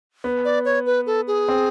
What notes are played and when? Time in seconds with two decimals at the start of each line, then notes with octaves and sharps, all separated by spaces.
0.24 B3
0.45 D5
0.65 C#5
0.86 B4
1.06 A4
1.27 G#4
1.48 C4